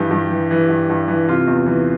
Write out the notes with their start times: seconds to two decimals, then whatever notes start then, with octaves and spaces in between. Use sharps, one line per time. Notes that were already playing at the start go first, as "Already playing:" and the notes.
Already playing: G2 E3 G4
0.11 G2
0.31 E3
0.51 E3
0.69 G2
0.89 G2
1.08 E3
1.29 C3 F4
1.47 E2
1.66 E3